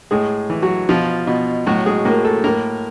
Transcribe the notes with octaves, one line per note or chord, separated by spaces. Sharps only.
A2 G#3 G#4
E3
F#3 F#4
B2 F3 F4
B2
A2 F#3 F#4
G#3 G#4
A2 A#3 A#4
A3 A4
A2 A#3 A#4